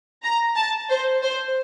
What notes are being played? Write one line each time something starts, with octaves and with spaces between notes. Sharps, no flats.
A#5
A5
C5
C5